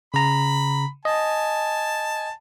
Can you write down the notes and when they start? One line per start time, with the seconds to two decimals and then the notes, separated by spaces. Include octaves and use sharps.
0.14 C#3 A#5 B5
1.05 D#5 G#5 A5